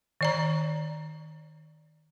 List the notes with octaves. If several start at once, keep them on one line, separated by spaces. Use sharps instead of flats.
D#3 D5 A#5